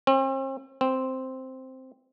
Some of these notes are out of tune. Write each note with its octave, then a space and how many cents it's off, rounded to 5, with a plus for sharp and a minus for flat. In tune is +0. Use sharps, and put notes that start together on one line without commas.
C4 +45
C4 +0